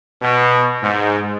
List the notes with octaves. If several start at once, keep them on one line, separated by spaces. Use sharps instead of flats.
B2
G#2